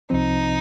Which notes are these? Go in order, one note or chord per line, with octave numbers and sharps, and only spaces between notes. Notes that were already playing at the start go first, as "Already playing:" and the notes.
C2 C3 F3 C4 D#4